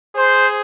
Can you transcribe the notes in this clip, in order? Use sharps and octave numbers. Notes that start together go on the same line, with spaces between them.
G#4 C5